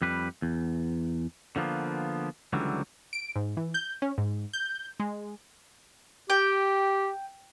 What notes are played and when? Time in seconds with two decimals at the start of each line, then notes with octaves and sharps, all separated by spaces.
0.02 F2 G3 B4
0.42 E2
1.56 D3 F3 A#3 B3
2.53 C#2 D3 E3 F#3 G3
3.13 D7
3.36 G#2
3.57 E3
3.74 G6
4.02 C#4
4.18 G#2
4.53 G6
5.00 G#3
6.30 G4 G5